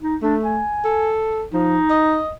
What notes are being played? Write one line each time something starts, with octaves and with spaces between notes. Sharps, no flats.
D#4
A3 D4
G#5
A4
F3 D#4
D#5